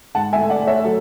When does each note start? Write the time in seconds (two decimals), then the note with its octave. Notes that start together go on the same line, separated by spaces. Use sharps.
0.15 G#2 F#5 A5
0.33 E5 G#5
0.38 A3
0.50 D5 F#5
0.62 A3
0.67 C#5 E5
0.84 F#3 A4